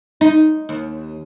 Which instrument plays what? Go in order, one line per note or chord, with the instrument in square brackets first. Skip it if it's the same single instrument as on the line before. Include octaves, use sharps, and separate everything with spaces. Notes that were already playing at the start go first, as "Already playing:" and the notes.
[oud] D#4
D#2